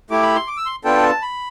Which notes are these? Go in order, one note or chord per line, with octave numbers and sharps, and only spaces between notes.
A3 E4 G4 D6
B5
C6
D6
E6
C6
B3 D4 F4 A4 G5
A5
B5